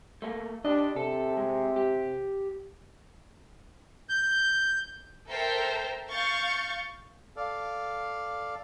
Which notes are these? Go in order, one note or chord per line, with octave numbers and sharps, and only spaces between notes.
A3 A#3
D4 G4 D#5
C3 A4
G#3
G4
G6
A4 A#4 C5 E5 G5 A#5
F5 C#6 G6 A6
A4 D5 F5